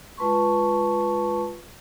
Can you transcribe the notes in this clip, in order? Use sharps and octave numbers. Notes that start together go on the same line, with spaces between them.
G#3 F4 B4 A5 C6 C#6